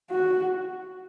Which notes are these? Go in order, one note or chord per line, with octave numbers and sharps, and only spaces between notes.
F#4